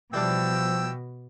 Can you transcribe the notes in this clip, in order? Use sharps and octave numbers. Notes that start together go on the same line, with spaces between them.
B2 E3 F3 G3 D4 G5 E6